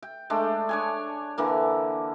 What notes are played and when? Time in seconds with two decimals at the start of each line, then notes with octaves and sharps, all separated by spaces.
0.02 G5
0.30 G#3 A3 D4 G5
0.69 D4 C#5 G#5
1.38 D3 E3 A#3